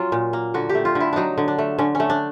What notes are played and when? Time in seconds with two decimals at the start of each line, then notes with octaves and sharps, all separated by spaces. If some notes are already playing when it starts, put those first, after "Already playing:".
Already playing: F#3 C#4 F4
0.12 A#2
0.33 A#3
0.54 D3 F#4
0.69 G4
0.75 A3
0.85 F4
0.95 D3
1.00 E4
1.13 F#3 D4 D#4
1.38 D3
1.48 D4
1.58 A3
1.78 D3 C#4
1.95 A3 C#4
2.10 D4